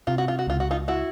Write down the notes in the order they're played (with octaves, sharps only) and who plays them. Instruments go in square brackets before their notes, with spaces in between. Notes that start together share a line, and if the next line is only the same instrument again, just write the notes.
[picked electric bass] C3 [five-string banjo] F4
[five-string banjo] F#4
F4
F#4
[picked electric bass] C#2 [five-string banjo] F4
[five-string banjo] F#4
D#4 F4
E4 F#4